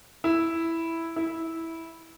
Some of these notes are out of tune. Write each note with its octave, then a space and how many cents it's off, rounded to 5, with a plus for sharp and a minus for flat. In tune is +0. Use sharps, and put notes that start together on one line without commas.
E4 +0
E4 -10